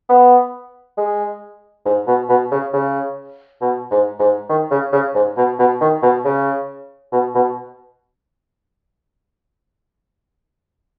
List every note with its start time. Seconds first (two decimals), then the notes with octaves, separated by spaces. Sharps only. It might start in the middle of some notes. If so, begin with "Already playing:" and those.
0.09 B3
0.98 G#3
1.86 G#2
2.07 B2
2.29 B2
2.51 C#3
2.73 C#3
3.61 B2
3.91 G#2
4.19 G#2
4.49 D#3
4.71 C#3
4.92 C#3
5.14 G#2
5.37 B2
5.59 B2
5.81 D#3
6.02 B2
6.25 C#3
7.12 B2
7.35 B2